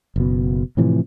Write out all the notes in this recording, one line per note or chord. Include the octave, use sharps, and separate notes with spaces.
F#1 B2
A2 C3 E3 F3